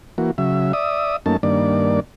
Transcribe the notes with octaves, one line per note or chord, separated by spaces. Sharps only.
E3 A#3 F#4
C#3 F#3 E5
D5 E5 D#6
F#2 A3 A#3 C#4 D#4 A5
G2 D#3 A#3 D4 D5